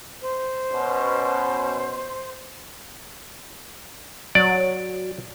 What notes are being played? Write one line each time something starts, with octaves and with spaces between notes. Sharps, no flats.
C5
B2 C#4
F#3 D5